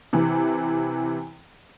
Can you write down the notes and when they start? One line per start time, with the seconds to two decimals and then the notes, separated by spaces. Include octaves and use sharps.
0.13 C3 E3